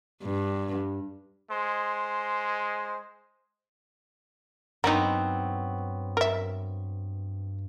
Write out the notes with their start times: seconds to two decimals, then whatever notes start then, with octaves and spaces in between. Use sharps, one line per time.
0.23 G2
1.51 G#3 C5
4.84 G2 F#3 B3 C4 D#4 A#4
6.17 A#4 E5